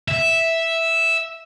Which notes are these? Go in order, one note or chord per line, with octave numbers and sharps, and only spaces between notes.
E5